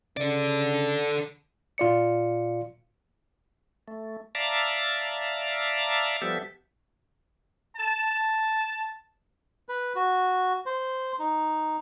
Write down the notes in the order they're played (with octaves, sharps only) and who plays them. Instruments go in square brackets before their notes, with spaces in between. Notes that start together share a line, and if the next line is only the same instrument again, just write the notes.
[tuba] C#3 [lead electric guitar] A4 D5
[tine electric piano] A#2 F4 D5 C#7
[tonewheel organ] A3
D5 E5 F5 A5 A#5 D6
F3 G3 B3 G4 A4 E5
[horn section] A5
[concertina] B4
F#4
C5
D#4